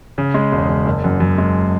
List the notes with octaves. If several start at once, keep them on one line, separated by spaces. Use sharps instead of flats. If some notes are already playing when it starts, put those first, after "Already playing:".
C#3
G#3
E1
C#3
F#1
F#2
F#2
G#3